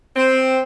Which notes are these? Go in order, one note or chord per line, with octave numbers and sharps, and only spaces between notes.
C4